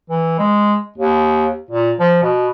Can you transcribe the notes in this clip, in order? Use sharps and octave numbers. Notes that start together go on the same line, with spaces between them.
E3
G#3
D#2
A#2
F3
B2